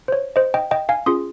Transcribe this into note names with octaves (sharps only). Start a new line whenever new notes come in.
C5
C#5
C5 D#5
D#5 G5
D#5 G5
F5 G#5
C#4 F4 G#4 C6 D#6